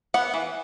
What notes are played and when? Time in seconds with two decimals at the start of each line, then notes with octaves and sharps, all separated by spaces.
0.14 B3 F#5
0.34 E3